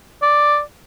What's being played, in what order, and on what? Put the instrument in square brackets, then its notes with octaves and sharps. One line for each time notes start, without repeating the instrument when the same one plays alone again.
[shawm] D5